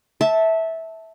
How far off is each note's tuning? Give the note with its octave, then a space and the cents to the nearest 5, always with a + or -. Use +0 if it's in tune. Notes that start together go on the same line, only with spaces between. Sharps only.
E5 -15 A5 +0